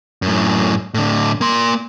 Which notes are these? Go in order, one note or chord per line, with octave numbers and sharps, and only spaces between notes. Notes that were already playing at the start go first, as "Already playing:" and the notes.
F#2 A2
A2 D3
A#3 C6